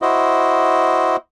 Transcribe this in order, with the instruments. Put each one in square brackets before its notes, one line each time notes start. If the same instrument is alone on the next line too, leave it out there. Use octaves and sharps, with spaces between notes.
[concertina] E4 F#4 C5 D#5